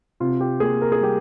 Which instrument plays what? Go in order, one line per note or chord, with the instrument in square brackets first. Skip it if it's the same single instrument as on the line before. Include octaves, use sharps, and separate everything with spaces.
[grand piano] C3 F4
G4
A#3 G#4
A#4
G#4
G3 G4